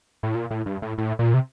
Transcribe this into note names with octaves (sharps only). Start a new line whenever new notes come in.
A2
A#2
A2
G2
A2
A2
A#2
C3